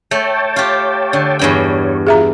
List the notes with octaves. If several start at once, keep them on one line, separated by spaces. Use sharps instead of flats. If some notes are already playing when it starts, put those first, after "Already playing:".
A3 C#5 G5 A5
F4 G4
D3
E2 G2 C#5 G5
F4 G#4 E5 A#5